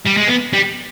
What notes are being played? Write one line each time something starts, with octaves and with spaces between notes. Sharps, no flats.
G3
G#3
B3
G3